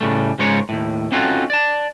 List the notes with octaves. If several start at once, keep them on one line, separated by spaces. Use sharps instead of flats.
A2 C#3 G3 A3
G#2 C#3 G#3 F4 A#4 C#5
D#2 A2
C4 C#4 D#4 F4 F#4 A4
D5 A5